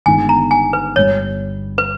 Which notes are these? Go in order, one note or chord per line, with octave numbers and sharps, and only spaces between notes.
G1 G2 D#3 G#3 B3 G#5
A#5
G#5
B4
G1 G2 G3 C#5
B4